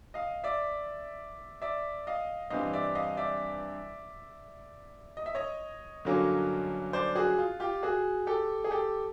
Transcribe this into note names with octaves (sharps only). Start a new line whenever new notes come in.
D#5 F5
D5 E5
D5 E5
D#5 F5
G2 E3 G3 C4 D#5 F5
D5 E5
D#5 F5
D5 E5
D#5
E5
C#5 D#5
G2 D3 F#3 A#3 C#4
C5 D5
F#4 G#4
F4
F4 G4
F#4 G#4
G4 A4
G#4
G4 A4